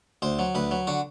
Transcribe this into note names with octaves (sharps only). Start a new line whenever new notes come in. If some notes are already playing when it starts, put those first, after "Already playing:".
D2 C5
F#3
D2 B4
F#3
D3 F#4